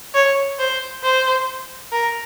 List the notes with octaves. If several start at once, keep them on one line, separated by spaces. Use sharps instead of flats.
C#5
C5
C5
A#4